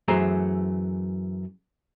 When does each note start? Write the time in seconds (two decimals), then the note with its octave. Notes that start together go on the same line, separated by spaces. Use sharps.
0.08 F#2 E3 A3 G#4 C5 A#5